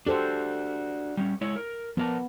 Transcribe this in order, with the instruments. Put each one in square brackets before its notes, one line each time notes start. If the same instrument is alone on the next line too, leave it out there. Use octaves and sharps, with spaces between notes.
[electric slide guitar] D4 F#4 [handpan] G4 A4 C5
[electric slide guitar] G3 C4 C#4
G#3 E4 C#5
A#4
[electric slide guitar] F3 A#4 A5 [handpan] B3